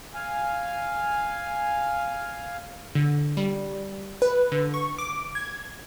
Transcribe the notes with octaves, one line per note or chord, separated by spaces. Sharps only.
F5 G#5
D3
G3
B4
D3
C#6
D6
G#6